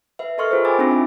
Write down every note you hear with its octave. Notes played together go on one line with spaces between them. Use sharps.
B4 E5
A4 A#4 D#5 C6 C#6 F6
F4 G#4 A#4 C5
G5 G#5 B5 D6 E6 A6
C4 D4 D#4 F4 D6 A#6
D#4 E5